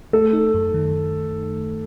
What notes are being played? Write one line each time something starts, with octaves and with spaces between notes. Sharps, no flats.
A3 A4
D#4
F#2
D#3